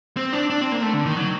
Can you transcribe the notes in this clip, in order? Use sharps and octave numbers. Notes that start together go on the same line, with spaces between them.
C4
D4
D4
C4
A#3
A3
D3
D#3
F#3